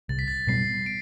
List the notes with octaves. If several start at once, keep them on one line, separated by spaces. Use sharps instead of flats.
C2 A6
B6
A6
B2 G3 B3 C7
D7